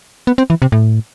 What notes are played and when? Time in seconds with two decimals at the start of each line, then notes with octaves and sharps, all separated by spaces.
0.27 B3
0.38 C4
0.50 E3
0.62 C3
0.72 A2